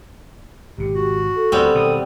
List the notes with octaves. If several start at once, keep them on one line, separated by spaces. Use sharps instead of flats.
G#1 B2 G4
F#4
A4
D2 G3 B3 C4
B2 D#3 D#6